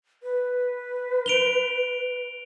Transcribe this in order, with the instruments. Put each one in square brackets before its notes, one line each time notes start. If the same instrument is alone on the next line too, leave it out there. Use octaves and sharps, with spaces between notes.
[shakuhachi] B4
[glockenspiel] D7 F7 G7